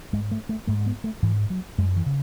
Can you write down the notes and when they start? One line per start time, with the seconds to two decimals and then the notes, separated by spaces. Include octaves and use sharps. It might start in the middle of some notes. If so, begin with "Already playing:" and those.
0.13 G#2 G#3
0.31 A3
0.49 A3
0.67 G#2 A3
0.87 B3
1.04 A3
1.22 G#2 E3
1.50 F#3
1.78 F#2 G#3
1.96 E3
2.06 C#3